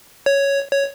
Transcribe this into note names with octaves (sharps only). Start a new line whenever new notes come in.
C#5
C#5